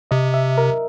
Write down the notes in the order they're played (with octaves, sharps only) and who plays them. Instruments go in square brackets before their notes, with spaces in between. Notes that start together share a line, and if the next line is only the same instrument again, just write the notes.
[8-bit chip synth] C3 [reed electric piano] D#5
[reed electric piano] E5
A#4